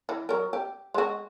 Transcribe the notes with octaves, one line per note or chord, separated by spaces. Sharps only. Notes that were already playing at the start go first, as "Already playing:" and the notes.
E3
F#3 A#4
G4
G#3 F#4